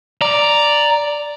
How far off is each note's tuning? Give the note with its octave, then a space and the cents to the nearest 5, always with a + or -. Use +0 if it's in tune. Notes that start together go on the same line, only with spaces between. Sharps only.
D5 +0 A#5 +0